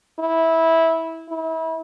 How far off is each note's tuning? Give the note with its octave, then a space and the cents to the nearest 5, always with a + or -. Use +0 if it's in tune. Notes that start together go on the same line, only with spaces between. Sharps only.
E4 -15
E4 -35